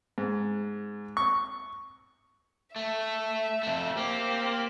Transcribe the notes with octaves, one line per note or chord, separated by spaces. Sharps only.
G#2
C#6
A3 E5
F2 A3
A#3 C4 G4